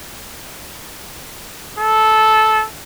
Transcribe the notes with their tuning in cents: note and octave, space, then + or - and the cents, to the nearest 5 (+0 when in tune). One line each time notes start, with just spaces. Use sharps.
A4 -15